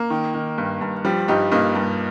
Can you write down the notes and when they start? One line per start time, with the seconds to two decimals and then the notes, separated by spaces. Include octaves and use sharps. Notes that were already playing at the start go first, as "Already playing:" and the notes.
Already playing: A#3
0.10 D#3
0.34 D#3
0.58 G2
0.81 G2
1.05 F3 G3
1.28 G2 D#4 G4
1.52 G2 A#3 D#4
1.75 G2